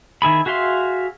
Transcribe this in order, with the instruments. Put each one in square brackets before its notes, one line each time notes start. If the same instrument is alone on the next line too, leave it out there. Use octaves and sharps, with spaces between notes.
[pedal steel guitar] D#3 E4 G#4 B5
F#4 G#4 E5 F5 C6